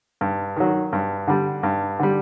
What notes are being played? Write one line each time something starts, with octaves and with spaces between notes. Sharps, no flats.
G2
D#3 F#3
G2
D3 G3
G2
D3 G3